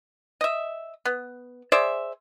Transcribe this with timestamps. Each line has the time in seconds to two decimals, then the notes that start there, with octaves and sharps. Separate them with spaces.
0.41 D#5 E5
1.05 B3
1.72 G#4 C5 D5 E5